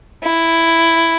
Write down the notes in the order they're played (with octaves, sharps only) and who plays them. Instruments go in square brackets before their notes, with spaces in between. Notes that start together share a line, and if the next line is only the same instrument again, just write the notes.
[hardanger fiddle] E4